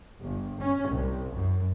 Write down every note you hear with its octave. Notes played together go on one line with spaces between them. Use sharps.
G1
C#4
C2
F#2